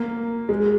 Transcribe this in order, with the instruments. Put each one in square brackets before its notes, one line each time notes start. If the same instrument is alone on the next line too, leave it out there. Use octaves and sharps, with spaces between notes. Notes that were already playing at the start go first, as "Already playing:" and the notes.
Already playing: [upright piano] A#3
G#3